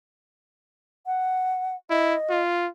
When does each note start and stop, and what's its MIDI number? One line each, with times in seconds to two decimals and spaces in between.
1.06 1.75 78
1.90 2.15 64
1.90 2.41 75
2.29 2.68 65